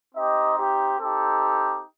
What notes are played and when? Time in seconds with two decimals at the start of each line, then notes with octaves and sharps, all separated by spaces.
0.15 C4 D#4 G4 D#5
0.57 G4
0.99 C4 D#4 G4 A4